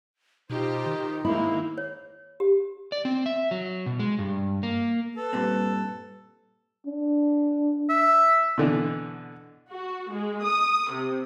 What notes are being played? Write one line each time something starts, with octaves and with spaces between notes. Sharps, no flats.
B2 D#4 F4 G4 C5
D#3
G#3 A#3 C4 E4
C#5
G4
D5
C4
E5
F#3
B2
G#3
G2
A#3
A4 B4
G2 A#2 C4
D4
E5
B2 D3 E3
F#4
G#3
D#6
C3